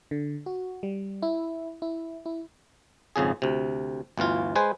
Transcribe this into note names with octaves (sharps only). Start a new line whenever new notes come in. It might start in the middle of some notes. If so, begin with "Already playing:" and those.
D3
F#4
G3
E4
E4
E4
G#1 F2 C#3 G#4
D2 C3
G1 D2 E3 F4
G#3 B4 C5 G#5